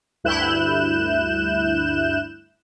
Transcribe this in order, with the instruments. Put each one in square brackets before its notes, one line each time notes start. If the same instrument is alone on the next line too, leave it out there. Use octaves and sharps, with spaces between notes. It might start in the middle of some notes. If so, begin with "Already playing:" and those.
[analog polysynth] D2 G2 E4 F#6 G6 E7